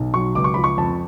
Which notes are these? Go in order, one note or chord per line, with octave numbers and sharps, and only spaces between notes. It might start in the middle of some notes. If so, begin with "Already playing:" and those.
Already playing: B1
F#3 C#6
C#2 D6
C#6
F3 B5
C#6
F2 A5